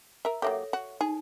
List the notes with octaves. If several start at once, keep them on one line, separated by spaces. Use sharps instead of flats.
A#4 E5
F#3 A#3 G4 A4 C#5 E5
F#4
D#4 G#4